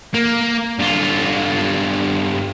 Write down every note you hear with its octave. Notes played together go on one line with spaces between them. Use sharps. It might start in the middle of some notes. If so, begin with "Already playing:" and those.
A#3
G2 F4